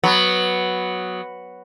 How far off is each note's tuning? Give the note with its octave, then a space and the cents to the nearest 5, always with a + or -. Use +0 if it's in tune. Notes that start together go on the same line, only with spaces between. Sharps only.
F#3 +0 B3 +0